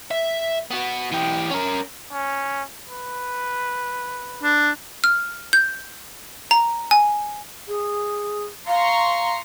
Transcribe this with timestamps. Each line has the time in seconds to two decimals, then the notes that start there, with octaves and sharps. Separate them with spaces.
0.11 E5
0.70 B3 F#4
1.12 E3 G4
1.51 C#4 A#4
2.12 C#4
2.88 B4
4.43 D4
5.04 F6
5.53 G6
6.51 A#5
6.91 G#5
7.68 G#4
8.67 F5 A#5 C6 C#6